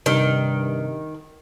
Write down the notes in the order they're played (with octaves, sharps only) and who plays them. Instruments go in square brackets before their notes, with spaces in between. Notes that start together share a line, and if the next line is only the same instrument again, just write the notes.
[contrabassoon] G2 [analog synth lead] C3 [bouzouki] D#3